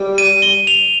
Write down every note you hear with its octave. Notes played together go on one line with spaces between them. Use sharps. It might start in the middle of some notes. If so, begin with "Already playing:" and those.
Already playing: G3
D#7
G7
F7